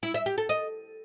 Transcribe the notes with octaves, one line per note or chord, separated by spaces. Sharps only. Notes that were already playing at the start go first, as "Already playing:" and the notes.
E4
E5
G4
A4
D#5